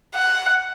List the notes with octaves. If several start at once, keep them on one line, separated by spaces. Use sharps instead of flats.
F#5